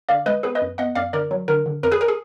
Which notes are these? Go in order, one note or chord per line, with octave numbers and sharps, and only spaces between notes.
D3 D5 F5
G#3 B4 D#5
B3 G#4 B4
B4 D#5
F#2
B3 D#5 F#5
F#2 D5 F5
D3 A#4 D5
F#3
D3 A#4
D3
F2 A#4
G#4 B4
A#4
G#4